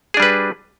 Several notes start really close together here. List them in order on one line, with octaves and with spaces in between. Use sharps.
G#4 D4 G3 B4